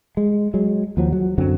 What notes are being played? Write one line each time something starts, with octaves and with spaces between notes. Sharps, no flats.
G#3
F#3 G#3
D#2 F3 F#3
F#3
F#2 D3 F#3 C4